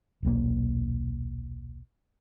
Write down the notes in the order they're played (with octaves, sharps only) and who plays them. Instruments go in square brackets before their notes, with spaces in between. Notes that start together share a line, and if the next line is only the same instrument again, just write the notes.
[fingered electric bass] D#1 B1 A#3